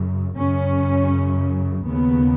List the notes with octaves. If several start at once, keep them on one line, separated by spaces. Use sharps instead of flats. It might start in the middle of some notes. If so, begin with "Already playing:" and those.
Already playing: F#2 C#3
F#2 C#3 C#4
D#2 C#3 B3